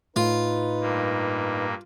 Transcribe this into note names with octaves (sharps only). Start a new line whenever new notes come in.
A2 D#4 F4 B4
G2 A#3